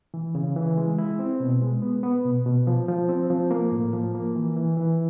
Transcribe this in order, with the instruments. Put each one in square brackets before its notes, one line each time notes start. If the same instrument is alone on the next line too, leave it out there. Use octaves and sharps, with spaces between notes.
[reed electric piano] E3
C#3
E3
G#3
E4
C4
B2
G#3
B3
B3
B2
B2
F3
F3
C4
F3
A#3
A2
F3
A#3
E3
E3
E3